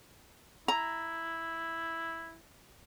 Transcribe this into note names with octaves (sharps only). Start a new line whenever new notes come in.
E4 A#5